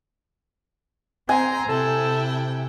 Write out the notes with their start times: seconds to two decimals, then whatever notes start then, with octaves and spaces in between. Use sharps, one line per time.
1.29 C4 G#5 A#5 C6
1.69 C3 E4 A4 G5